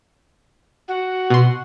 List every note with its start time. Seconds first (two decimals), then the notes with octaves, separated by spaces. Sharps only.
0.88 F#4
1.30 B2 C6